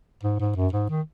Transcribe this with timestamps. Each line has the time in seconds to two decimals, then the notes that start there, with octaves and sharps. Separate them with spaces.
0.23 G#2
0.40 G#2
0.56 F#2
0.73 G#2
0.90 D#3